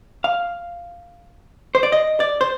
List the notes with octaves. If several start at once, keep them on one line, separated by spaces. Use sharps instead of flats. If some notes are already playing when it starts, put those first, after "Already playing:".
F5
C5
D5
D#5
D5
C5